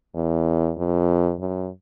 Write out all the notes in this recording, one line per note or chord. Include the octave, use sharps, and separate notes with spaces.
E2
F2
F#2